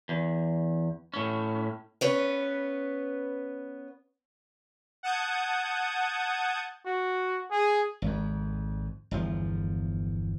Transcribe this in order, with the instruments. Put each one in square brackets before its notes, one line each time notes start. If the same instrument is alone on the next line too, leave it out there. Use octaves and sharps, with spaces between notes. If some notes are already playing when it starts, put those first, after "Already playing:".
[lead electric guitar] E2
A2 C#4
[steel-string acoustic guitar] B3 C#4 B4
[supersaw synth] F#5 A5 D#6 G6 G#6
[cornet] F#4
G#4
[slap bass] G#1 F2
G1 E2 F3